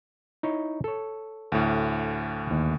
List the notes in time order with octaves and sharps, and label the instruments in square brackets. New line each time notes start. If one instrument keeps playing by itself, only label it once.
[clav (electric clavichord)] D#4 E4 C#5
A4 C#5
[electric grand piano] D2 A2
[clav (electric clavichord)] D#2